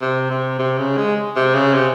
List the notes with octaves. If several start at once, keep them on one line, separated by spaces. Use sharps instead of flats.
C3
C3
C3
C#3
G#3
C3
C#3
C3